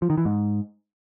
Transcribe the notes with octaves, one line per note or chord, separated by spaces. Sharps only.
F3
D#3
E3
G#2